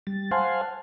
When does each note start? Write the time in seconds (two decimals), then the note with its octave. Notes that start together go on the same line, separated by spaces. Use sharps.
0.07 G3 A6
0.31 C5 F5 F#5 G#5 A5 C6